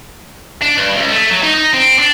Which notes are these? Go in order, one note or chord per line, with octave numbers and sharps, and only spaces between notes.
D4
G2
C#2
A3
F#3
D#4
D#4
C4
D4